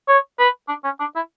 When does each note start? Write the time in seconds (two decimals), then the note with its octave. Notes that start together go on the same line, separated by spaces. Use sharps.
0.08 C#5
0.39 B4
0.68 D4
0.84 C#4
1.00 D4
1.15 E4